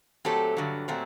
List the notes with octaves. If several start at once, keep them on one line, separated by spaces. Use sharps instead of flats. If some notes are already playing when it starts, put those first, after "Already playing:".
A#2 F#3 A3 C4 G4 A4
G2 D3 F#3
A#2 F#3 A3 C4